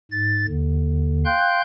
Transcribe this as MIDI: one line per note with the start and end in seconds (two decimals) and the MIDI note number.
0.11 0.46 44
0.11 0.46 93
0.47 1.24 39
0.47 1.24 50
1.25 1.62 77
1.25 1.62 79
1.25 1.62 84
1.25 1.62 90
1.25 1.62 91